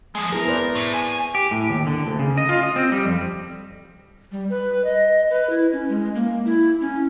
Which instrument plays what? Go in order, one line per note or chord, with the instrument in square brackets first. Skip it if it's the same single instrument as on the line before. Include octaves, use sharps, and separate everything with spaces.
[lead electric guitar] F3 G#3
[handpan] B3 E4 G#4 [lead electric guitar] A#4
[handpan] B4 C5 D5
[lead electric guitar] A2
G#5
[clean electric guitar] G4
A2
D#2
D3
D2
C#3
D#5
F4
D#5
C4
G3
F2
[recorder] G3
B4
D#5
B4
E4
C#4
G#3
A#3
E4
C#4